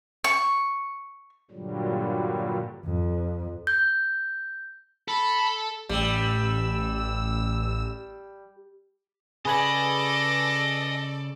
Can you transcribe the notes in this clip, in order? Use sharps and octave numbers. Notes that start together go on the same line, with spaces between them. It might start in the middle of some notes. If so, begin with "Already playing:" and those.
C#6
G2 A#2 D3 F#3 G3
F2
G6
A4 B5
A1 G3 E6
C#3 G#4 A4 B4 D5 D#5 G#5 B5